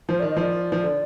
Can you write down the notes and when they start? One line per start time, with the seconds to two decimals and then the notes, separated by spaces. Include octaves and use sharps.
0.09 F3 C5
0.20 D#3 D5
0.31 D#5
0.36 F3 D5
0.72 F3
0.83 D3